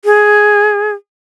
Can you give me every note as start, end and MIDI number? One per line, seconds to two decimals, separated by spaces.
0.05 0.92 68